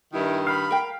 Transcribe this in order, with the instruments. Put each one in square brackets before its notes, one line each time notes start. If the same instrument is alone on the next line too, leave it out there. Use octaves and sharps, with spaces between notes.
[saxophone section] G2 D#3 [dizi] E4
[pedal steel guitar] F5 [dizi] B5
[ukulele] A#4 G5